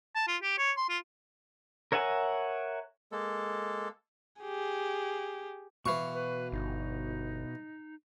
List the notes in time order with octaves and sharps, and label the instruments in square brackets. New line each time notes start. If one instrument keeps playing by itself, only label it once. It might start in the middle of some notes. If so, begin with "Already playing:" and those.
[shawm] A5
F4
G4
C#5
C6
F4
[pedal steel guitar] A#4 C#5 E5 F#5 G#5
[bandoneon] G#3 A#3 A4
[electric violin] G4 G#4
[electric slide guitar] B2 F#4 F5 [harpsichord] E3 C#6
[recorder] B4
[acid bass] G1 [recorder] D#4